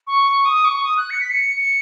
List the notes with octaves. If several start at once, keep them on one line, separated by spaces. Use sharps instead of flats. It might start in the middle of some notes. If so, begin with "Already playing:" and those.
C#6
D#6
C#6
D#6
F#6
C#7
B6
C#7
C#7